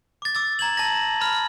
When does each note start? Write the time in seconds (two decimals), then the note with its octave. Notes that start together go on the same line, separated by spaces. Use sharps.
0.22 D6 A6
0.35 D6 E6 A6
0.59 A#5 G#6 F#7
0.77 A5 A#6
1.21 B5 F6